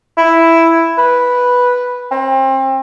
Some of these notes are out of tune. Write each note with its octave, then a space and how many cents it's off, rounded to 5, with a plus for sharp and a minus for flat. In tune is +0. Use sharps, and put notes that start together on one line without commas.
E4 +0
B4 -5
C4 +30